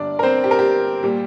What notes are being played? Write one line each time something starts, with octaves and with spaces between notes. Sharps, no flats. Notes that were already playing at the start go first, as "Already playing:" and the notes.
Already playing: G1 G2 D4 D5
A#4
C4 C5
G4
A#4
G4
A#2 G3